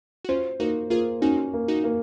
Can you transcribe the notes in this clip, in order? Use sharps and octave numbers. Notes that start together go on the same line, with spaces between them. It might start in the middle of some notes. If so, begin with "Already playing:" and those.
F#4
C#4 F4 C5
A#3 D#4 F#4
A#3 F4 G#4
C#4 D#4 F#4
A#3
D#4 F#4
A#3